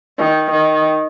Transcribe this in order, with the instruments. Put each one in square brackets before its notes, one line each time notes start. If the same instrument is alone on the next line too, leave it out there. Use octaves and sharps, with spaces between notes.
[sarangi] D#3
D#3